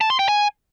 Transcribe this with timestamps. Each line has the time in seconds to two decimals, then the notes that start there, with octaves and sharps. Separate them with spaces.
0.01 A5
0.10 C6
0.19 G5
0.28 G#5